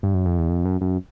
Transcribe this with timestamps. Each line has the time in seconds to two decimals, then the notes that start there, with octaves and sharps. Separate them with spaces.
0.03 G2
0.14 F#2
0.26 F2
0.38 E2
0.50 F2
0.65 F#2
0.81 F#2